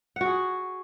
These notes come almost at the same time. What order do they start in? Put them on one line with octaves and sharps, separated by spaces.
F#5 F#4 G#4